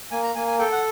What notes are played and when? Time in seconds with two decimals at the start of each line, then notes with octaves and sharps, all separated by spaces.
0.11 A#3 G#5
0.23 A#5
0.35 A#3 G#5
0.47 G#5
0.59 A4 G5
0.72 F#5